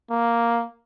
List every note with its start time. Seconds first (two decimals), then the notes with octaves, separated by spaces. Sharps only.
0.11 A#3